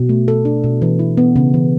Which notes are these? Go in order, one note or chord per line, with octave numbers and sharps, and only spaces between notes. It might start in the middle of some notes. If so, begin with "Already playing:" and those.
Already playing: B2
A3
A4
D4
B2
E3
E4
B3
C#3
E3